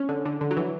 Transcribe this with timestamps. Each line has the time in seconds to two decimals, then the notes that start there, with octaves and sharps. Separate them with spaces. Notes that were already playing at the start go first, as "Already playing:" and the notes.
Already playing: C#4
0.09 D3
0.25 D3
0.41 D3
0.51 F#3
0.57 E3